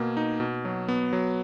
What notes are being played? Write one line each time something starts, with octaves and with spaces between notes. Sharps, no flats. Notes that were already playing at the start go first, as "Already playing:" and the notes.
Already playing: B2 A#3
D#4
B2
F#3
B3
F#3